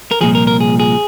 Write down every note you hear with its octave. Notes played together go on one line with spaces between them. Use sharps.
A#4
C2 A#2 F3 G#4
A#4
A#4
G#4
G#4